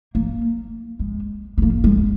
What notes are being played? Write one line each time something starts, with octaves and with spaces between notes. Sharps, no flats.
A#3
G#3
B3
A#3
G#3